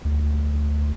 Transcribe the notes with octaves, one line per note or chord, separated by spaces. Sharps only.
D2